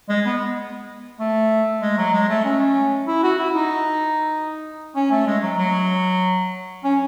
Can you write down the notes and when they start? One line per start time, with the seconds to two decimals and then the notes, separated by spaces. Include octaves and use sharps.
0.09 G#3
0.25 B3
1.20 A3
1.82 G#3
1.97 F#3
2.13 G#3
2.29 A3
2.44 C#4
3.07 E4
3.23 F#4
3.38 E4
3.54 D#4
4.96 C#4
5.11 A3
5.27 G#3
5.43 F#3
5.58 F#3
6.84 C#4